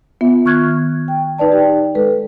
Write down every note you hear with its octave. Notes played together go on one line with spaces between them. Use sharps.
B3 F4 E5
D#3 C#6 F6 F#6 G#6
G5
D#4 B4 D5 A5
G4 G5
G#3 A4 B4